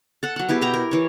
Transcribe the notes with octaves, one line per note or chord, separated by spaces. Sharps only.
A4 F#5
F#3 F#5
B3 E4 G4 G#4
B2 G5 A#5
A#4
E3 C#5